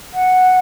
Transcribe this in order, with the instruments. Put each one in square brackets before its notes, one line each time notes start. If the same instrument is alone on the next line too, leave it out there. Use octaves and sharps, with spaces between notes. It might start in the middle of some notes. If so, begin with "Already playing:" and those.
[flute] F#5